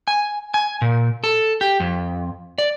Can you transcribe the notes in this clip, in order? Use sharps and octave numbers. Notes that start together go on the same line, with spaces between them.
G#5
G#5
A#2
A4
G4
F2
D5